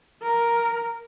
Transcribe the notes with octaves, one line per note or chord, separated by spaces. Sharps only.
A#4